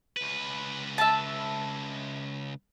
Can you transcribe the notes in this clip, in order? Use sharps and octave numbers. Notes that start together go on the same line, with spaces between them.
C#2 B4
E5 A5